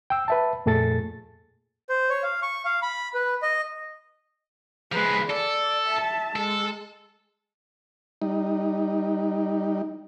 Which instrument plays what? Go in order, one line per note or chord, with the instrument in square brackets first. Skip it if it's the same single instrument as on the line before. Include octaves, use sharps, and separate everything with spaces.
[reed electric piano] G5 E6
B4 E5 A5
F2 A#2 A3 G#4 A4 A6
[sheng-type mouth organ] C5
C#5
F5
C#6
F5
B5
B4
D#5
[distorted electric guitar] F3 G#3 [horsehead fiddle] G#4 B4
[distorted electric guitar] A4 [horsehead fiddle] D5
[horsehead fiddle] E5 A5
[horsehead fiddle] G#3 [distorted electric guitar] A4
[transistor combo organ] G3 D#4